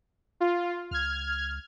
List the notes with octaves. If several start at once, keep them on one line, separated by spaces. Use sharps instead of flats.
F4
C#2 F6 G#6